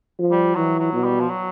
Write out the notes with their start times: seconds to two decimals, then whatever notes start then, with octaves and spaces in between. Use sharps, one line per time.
0.19 F3
0.32 G3
0.55 E3 F#3
0.80 F#3
0.93 B2
1.04 G3
1.20 F3
1.30 F#3